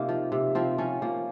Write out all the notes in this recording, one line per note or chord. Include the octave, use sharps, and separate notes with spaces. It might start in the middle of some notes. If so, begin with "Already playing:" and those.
Already playing: C3 A#3 D#4 F4
F3
C3
F3 C4
F3 C#4
F3 A#3